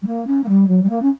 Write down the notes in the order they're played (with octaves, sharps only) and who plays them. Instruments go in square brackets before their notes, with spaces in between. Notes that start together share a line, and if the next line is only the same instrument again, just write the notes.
[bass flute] G3
A#3
C#4
A#3
G3
F#3
G3
A#3
C#4